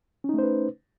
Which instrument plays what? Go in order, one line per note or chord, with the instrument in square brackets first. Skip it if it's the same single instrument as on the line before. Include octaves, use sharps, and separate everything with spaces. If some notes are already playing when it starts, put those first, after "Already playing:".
[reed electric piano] C#4
D#4
A3
C5
B4